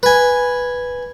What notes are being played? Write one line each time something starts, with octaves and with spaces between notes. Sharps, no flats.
B4 G#5